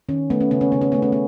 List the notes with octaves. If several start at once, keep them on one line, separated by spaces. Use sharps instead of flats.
D#3 C#4
A3 B3
C#4
C#3 B3
C#4
C#3 B3
C#4
A3 B3
C#4
B3